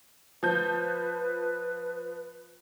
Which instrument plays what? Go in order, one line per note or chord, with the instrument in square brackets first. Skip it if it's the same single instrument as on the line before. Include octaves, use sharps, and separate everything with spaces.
[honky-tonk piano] F3 G6 [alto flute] B4